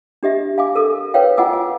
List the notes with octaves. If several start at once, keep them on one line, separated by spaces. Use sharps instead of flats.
D4 G4 D#5 E5
F5 G#5 D6
A4 A#4
A#4 B4 C#5 F5 G5
F4 D#5 F#5 G#5 D6 E6
G#5